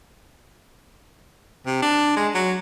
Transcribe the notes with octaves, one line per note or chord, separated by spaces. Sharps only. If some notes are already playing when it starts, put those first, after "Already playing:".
C3
D4
G#3
F#3